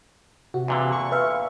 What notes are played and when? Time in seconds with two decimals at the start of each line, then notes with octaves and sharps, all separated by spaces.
0.54 C3 F#4
0.68 E2 A#2 D3
0.92 C#6
1.12 B4 E5 F5